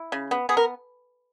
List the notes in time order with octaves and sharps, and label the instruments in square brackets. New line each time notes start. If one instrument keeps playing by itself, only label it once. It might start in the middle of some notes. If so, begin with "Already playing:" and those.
Already playing: [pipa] E4
C#3
B3
B3 G#4
A#4